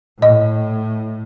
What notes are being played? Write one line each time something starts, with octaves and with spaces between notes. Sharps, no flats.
A2 D#5